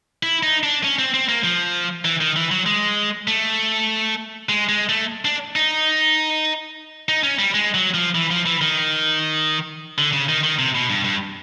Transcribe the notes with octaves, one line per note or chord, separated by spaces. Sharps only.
E4
D#4
D4
C#4
C4
C4
A#3
F3
E3
D#3
E3
F#3
G#3
A3
G#3
G#3
A3
D4
D#4
D#4
C#4
G3
G#3
F#3
F3
E3
F3
E3
D#3
D3
C#3
D#3
D#3
C3
B2
G2
G2